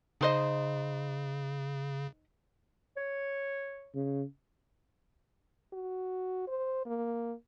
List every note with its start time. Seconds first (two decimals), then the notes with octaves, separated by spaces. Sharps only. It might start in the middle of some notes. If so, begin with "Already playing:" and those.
0.21 C#3 D#4 C5 D#5
2.97 C#5
3.94 C#3
5.73 F#4
6.47 C5
6.86 A#3